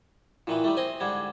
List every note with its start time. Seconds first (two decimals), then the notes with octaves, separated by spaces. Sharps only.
0.47 A#2 D#3 E3 E4
0.64 D#3 G3 A3
0.77 C4 C5 D#5 G#5
1.00 G#2 D3 G3 G#6